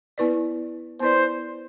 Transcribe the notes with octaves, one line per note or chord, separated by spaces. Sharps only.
B3 E4 B4 D5
B3 E4 B4 C5 D5